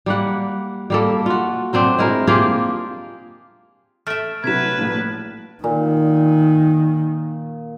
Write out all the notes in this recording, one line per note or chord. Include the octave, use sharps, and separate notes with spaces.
G3 A#3 F#5
G3 A#3 A4
F4 F#4
F#3 A3 C4 D4
G#3 E4 A#4
A#3 F4 G4 G#4
A3 E5 F6 A6 D7
C3 F#3 B4 G#6 B6 E7
A#1 A2
A#2 D#3